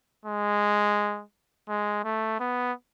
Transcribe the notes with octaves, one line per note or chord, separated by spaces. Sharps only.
G#3
G#3
A3
B3